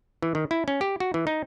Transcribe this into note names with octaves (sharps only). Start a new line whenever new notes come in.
E3
D#3
E4
C#4
G4
F#4
E3
D#4